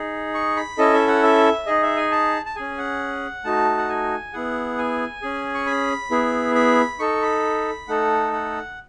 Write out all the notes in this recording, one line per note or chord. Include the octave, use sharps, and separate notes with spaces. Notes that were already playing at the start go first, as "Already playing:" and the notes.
Already playing: D#4 G#4
C#6
B5
C#4 E4 A4 D#5
E5
F#5
E5
D#4 G#4 D#5
E5
G#5
A5
A5
C#4 G#4 G#5
F#5
A3 D#4 F#4 A5
F#5
G#5
B3 E4 G#4 F#5
G#5
C#4 G#4
C#6
B5
B3 E4 G#4
B5
D#4 A4 C#6
B5
A3 D#4 A4 F#5
F#5